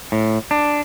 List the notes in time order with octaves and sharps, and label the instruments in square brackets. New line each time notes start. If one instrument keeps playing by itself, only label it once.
[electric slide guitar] A2
D4